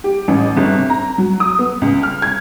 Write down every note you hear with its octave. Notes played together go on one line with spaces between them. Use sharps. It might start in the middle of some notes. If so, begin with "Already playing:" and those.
G4
A1
G1
C3
A#5
F#3
D#6
B3
C#2
F6
G#6